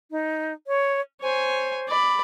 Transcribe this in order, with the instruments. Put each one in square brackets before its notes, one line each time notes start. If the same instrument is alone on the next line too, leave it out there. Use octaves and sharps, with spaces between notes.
[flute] D#4
C#5
[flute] C5 [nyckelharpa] C#5 G#5
[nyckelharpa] D5 B5